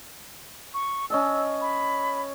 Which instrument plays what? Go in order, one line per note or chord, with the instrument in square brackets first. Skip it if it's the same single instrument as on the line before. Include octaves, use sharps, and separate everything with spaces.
[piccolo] C#6
[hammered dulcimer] C#4 D#5 A5 [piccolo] E6
[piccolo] B5